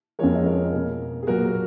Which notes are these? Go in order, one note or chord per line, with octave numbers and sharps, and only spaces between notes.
F2 F3 G#3 A#4 C#5
D#5
A#4 C#5
B2 A#3
G#4
A#2 F#3 B3 F#4 A#4